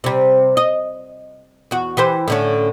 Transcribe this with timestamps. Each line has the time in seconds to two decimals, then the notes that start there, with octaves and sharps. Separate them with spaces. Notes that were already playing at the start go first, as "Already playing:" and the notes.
0.04 C3 G3
0.57 D#5
1.71 E2 F#4
1.97 E3 G4 C5
2.28 A2 D3 C#4